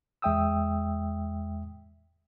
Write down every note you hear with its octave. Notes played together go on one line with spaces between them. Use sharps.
E2 G#3 E5 G5 D#6 E6